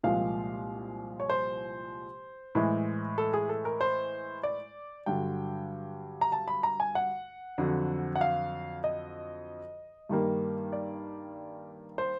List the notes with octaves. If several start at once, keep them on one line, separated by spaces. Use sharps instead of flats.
C2 A#2 F3 G#3 F5
C#5
C5
A2 E3 G#3
A4
G#4
A4
A#4
C5
D5
G2 D3 F#3 G5
A#5
A5
B5
A#5
G#5
F#5
F2 D3 F#3
F#5
F5
D#5
G2 D#3 G3 A#3
D5
C5